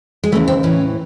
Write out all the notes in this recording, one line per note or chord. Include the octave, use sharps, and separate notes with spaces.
G#3
D#2 C#3 E3 A3
C4
A2 E3 C#4